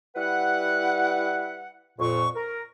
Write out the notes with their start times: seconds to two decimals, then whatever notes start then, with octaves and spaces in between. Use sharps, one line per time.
0.15 G3 E4 B4 F#5
1.99 F2 A#2 C#6
2.36 A#4